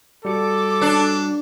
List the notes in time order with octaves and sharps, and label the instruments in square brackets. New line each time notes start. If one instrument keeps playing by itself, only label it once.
[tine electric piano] G3 F#4 C#7 [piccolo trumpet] A4 [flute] D6
[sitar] D4